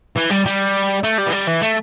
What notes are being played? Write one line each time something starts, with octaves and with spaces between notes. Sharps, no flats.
E3
G3
G3
A3
G3
E3
G3
E3
A3